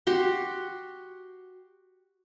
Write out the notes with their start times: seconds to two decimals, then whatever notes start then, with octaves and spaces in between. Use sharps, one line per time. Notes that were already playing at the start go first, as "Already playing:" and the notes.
0.07 F#4 G4 C6